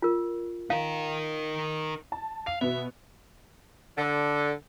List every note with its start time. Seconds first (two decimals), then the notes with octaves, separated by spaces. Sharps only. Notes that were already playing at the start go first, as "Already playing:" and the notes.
0.02 F4 A#4
0.70 D#4 A#4 F5
2.12 A5
2.46 F5 F7
2.61 B2 B3 E5
3.98 D3